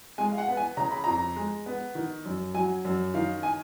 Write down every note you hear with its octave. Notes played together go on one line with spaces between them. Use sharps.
G#3 G#5
F5
F#5
B3
G#5
C#3 A#5
B5
F2 A#5
G#3
B3
D#3
F#2
F#3 G#5
F#2
D#3 F5
G#5